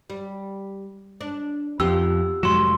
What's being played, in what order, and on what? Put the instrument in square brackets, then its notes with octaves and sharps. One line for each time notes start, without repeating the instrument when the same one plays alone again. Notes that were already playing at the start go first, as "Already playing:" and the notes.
[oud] G3
D4
[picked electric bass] F2 [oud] B3 F4 G4 [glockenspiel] E6
[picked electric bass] F1 G#2 F#3 [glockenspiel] C6 E7